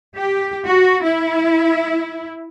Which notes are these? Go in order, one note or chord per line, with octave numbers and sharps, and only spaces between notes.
G4
F#4
E4